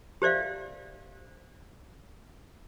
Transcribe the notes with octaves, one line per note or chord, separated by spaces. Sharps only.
G4 C5 D5 E5 F5